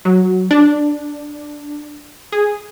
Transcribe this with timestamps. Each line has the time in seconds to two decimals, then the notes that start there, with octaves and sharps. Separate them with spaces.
0.05 F#3
0.51 D4
2.32 G#4